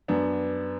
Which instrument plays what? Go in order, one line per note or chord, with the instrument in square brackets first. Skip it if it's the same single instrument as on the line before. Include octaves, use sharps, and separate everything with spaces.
[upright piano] F#2 B3 D4